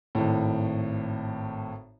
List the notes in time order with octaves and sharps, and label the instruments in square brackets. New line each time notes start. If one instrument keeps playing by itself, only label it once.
[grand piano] G#1 A2